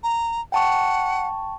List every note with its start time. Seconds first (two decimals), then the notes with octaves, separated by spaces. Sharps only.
0.03 A#5
0.52 F#5 G5 A5 C#6